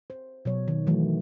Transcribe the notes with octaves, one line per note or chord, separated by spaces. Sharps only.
C5
B2 F#3 C#5
D#3
D#3 E3 F#3 A3